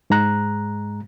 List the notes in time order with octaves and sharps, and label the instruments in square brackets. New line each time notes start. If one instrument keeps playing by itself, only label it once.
[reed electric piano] G#2 G#3 A#5 F#6